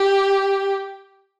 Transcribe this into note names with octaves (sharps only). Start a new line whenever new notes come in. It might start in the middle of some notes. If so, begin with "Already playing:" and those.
Already playing: G4